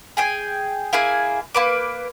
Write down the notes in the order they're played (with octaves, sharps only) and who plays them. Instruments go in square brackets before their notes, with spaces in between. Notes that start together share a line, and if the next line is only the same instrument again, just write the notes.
[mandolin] G#4 G5 G#5
A#3 E4 G#4 G#5
A#3 B4 D6